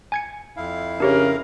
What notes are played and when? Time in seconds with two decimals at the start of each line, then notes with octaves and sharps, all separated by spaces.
0.12 G#5 G#6 C#7
0.57 F2 E4 F5
1.00 C#3 D4 G4 A#4 C#5